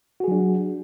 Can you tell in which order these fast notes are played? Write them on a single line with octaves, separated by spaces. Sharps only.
F#4 G#4 F#3 D4